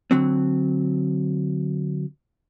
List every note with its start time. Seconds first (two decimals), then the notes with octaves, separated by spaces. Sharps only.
0.11 D3 F#3 C4